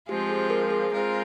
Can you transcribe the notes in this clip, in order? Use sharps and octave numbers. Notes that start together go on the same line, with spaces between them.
F3 G#3 C4 F4 G4
G#4
G#4 A#4
G#4
G#3 C4 F4 A#4